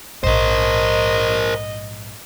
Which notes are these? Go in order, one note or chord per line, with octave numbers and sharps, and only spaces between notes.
A#1 G#2 A#4 C5 D#5